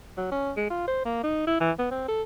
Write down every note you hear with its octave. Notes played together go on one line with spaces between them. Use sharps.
F#3
C#4
G#3
F4
C5
A#3
D#4
E4
E3
B3
C4
A4